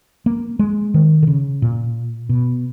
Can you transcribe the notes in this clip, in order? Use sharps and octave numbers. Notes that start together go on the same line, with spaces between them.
A#3
G#3
D#3
D3
C#3
A#2
B2